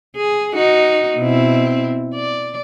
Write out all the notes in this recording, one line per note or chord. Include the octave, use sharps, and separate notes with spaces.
G#4
D#4 F#4
B2 C4 E4
D5